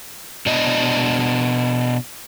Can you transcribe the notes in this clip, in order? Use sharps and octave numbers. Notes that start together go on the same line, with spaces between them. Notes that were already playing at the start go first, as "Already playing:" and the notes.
B2 D4 D#5